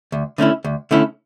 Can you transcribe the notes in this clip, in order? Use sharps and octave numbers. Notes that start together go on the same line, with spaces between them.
D2
D3 A3 C#4 E4
D2
D3 A3 C#4 E4